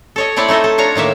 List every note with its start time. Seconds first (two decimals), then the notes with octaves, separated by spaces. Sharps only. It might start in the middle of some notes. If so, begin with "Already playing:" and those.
0.16 A4 C#5 D#5
0.36 A3 C4 E4 C#5 D5
0.49 A3 D#4 A4 D#5 E5
0.64 A4
0.78 D4 F4 C#5 A#5
0.95 A2 D#3 A#3 E5